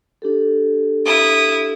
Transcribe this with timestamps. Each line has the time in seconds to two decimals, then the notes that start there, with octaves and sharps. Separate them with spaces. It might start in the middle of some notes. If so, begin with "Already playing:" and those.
0.22 D4 G4 A4
1.06 E4 D#6